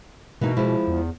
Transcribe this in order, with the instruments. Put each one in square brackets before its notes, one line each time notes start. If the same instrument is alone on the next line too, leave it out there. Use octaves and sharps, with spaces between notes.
[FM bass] B2 [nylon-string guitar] E3 A#3 D#4
[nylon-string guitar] F3 G#3 E4
[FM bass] E2